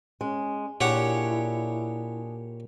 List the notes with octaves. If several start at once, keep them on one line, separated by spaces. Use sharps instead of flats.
G#3 C#4
A#2 D4 E4 G4 G#4 C#5 F#5